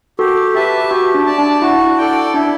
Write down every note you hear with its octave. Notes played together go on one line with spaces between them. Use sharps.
F#4 G4 A4
G4 B4 E5 A5
F#4 G4
D4
D5 A5
D4
E4 F#4
A4 D5 G5
D4 E4